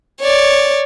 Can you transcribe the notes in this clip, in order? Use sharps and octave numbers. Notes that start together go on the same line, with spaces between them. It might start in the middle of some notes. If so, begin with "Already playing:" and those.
C#5 D5